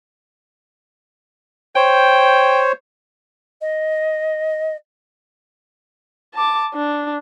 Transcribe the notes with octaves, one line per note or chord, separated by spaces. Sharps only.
C5 C#5 G5
D#5
A5 D6
D4